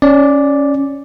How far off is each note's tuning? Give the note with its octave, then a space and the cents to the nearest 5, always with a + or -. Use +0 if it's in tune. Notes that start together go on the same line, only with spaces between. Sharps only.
C#4 +0 D5 +0